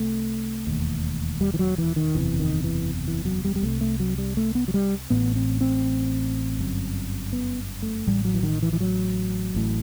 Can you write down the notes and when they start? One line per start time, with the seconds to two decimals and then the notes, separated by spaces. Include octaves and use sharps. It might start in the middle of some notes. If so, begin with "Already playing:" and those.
Already playing: C2 C3 A3
0.67 E1 D#2
1.41 G3
1.54 E3
1.59 F#3
1.78 E3
1.96 D#3
2.15 F#1 E2 C3 E3
2.39 D#3
2.64 E3
3.08 E3
3.25 F#3
3.45 G3
3.56 G3
3.63 C2 C3 A3
3.81 A3
4.00 F#3
4.18 G3
4.37 A3
4.55 B3
4.68 F#3
4.74 G3
5.10 A1 A2 B3
5.36 C4
5.61 C4
6.59 G1 F#2
7.33 B3
7.82 A3
8.07 A1 A2 G3
8.25 F#3
8.34 E3
8.43 D#3
8.62 E3
8.73 E3
8.81 F#3
9.55 A1 A2